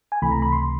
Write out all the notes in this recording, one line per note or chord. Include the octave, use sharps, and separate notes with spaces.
G#5
C#2 C3 E3 A3 B5
A#5
B5
C6